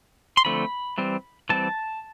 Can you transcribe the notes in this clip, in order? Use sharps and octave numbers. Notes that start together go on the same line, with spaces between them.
C6
D3 F3 A3 C4 B5
E3 G3 C4
E3 G3 C4 A5